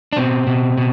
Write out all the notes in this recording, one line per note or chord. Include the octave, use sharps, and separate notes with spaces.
D4
B2 C4
B2
B2